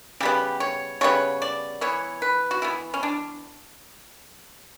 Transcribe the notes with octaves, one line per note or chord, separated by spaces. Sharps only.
C#3 G3 B3 G4
C#5
C#3 G3 B3 C#5
D5
E3 B3 C#5
B4
F#4
E3 B3 E4
C#4
D4